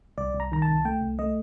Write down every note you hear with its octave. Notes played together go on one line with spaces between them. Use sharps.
C2 D5
C2
A#5
D#3 A#5
A5
C2
A3 G5
C2
A3 D#5